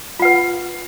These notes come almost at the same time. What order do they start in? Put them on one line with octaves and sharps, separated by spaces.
F4 F#5 B4